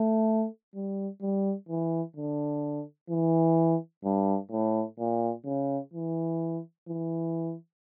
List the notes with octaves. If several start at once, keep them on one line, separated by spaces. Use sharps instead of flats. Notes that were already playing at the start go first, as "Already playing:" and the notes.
Already playing: A3
G3
G3
E3
D3
E3
G2
A2
A#2
C#3
E3
E3